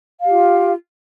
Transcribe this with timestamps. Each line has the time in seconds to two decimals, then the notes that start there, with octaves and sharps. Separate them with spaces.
0.19 F5
0.24 G4
0.29 F4